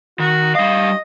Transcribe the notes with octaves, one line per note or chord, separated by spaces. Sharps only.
D#3 F#4
G3 D#5 F5